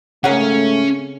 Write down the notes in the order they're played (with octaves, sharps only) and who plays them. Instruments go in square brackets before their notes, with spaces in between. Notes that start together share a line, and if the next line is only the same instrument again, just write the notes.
[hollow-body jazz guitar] G#2 A#4 F#5 [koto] C#3 G#4 [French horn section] A3 [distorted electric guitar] C#4